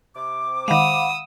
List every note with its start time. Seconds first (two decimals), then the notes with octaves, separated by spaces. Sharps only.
0.15 C3 D6
0.68 D#3 G#3 F5 F#5 B5 D#6 E6